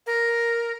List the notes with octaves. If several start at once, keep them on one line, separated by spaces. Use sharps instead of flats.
A#4